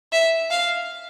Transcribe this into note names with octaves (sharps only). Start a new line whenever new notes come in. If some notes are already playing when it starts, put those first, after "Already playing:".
E5
F5